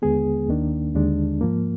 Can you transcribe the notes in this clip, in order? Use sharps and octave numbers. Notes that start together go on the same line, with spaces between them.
D#2 D3 G#3 B3 G#4
D#2 D#3 A#3 D4
D#2 D3 G#3 D4
G#2 F3 A#3